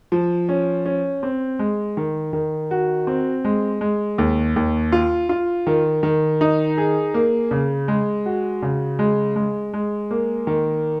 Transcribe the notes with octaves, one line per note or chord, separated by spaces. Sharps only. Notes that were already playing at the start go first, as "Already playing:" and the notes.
F3
C#4
C#4
C4
G#3
D#3
D#3
F#4
C4
G#3
G#3
D#2
D#2
F4
F4
D#3
D#3
D#4
G#4
A#3
C#3
G#3
F#4
C#3
G#3
G#3
G#3
A#3
D#3